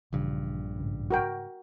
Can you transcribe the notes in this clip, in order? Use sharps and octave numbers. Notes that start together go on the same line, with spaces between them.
A#1 G2 C#3 E3 G3
G#2 C#3 G3
F#4 A#4 G5